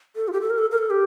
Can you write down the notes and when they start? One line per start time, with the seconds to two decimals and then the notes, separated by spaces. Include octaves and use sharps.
0.16 A4
0.28 F4
0.33 G4
0.41 A4
0.50 A#4
0.58 A4
0.72 A#4
0.78 A4
0.90 G4